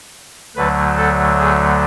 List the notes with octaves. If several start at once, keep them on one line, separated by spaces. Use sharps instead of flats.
D2 D3 F#3 A3 B4
A4
G#4